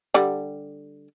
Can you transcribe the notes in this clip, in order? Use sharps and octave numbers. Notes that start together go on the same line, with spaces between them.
D3 G3